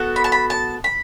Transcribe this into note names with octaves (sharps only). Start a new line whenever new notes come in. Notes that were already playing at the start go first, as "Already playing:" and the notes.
Already playing: B3 F#4 A4
B5
A5
B5
A5
B5